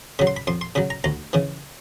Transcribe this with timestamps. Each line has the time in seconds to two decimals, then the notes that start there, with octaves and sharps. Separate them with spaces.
0.19 C#3 F#3 B5
0.27 C6
0.36 B5
0.47 F2 C6
0.61 C6
0.75 C#3 F#3 B5
0.90 A#5
1.04 D2 A#5
1.33 C#3 E3